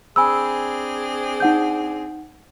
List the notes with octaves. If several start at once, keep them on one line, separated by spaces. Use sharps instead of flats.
C4 D4 G#4 G#5 B5 E6
D#4 F#5 G6